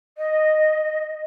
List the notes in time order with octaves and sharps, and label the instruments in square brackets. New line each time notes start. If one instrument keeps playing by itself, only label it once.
[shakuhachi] D#5